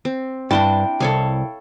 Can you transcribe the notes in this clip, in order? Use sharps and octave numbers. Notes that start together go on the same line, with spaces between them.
C4
G2 D4 E4 C5 G5 A5
C2 A4 C#5 F5